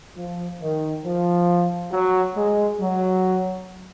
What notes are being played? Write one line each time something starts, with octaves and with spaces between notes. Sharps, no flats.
F3
D#3
F3
F#3
G#3
F#3